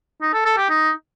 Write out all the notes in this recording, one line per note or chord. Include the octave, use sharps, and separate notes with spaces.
D#4
A4
A4
G4
D#4